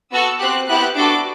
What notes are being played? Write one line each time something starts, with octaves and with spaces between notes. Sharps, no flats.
B3 F#4 A4 E6
C4 G4 F#6
B3 E4 G4 F#6
D4 F#4 A4 D6